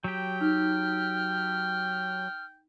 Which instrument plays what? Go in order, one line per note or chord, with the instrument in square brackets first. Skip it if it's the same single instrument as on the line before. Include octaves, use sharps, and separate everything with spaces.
[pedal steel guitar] F#3 G4 [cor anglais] G5
[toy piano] D#4 [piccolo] F6